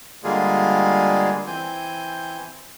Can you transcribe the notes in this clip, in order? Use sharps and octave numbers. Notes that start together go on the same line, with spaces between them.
D3 G3 G#3 A#3 F4 G#4
E3 C4 G#5 G6